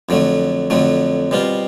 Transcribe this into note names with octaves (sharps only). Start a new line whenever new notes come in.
F2 D3 F#3 A3
F2 D3 F#3 A3
B2 G3 C4 F4